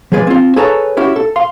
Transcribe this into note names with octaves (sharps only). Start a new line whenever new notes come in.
F3 G#3 G#4 B4 D5
C4 F4
G#4 A4 B4 C#5 A#5
C#4 E4 F#4 G4
A4
F5 C6